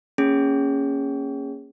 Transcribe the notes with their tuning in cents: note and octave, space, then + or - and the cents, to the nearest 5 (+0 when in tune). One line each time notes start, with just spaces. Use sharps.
A#3 +0 C#4 +0 G#4 -20